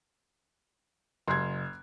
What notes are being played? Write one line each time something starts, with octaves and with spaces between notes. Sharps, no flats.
F#1 C6 F#6 G#6